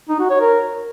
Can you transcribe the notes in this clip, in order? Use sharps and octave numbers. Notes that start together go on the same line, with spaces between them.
D#4
F#4
C#5
A#4